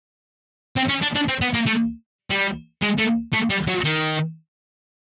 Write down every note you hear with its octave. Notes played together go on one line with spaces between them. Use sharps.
C4
C#4
D4
D4
C4
B3
A#3
A3
G3
G#3
A3
A3
G3
F#3
D#3